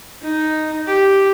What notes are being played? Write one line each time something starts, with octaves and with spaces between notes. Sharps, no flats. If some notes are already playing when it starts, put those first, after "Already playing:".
D#4
G4